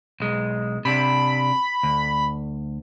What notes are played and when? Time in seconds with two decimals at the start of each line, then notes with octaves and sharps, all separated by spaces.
0.20 B1 G#3
0.85 C3 D4 B5
1.83 D2